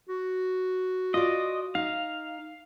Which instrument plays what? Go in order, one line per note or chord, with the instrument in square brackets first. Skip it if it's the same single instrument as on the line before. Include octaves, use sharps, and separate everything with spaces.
[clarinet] F#4
[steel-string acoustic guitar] F4 D5 [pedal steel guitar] D#5
[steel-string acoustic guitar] D#4 [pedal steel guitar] F5